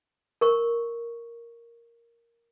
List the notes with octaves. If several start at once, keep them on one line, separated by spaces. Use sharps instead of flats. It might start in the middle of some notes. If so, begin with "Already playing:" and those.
A#4 C#6